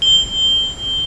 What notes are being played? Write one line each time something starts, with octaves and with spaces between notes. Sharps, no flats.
G7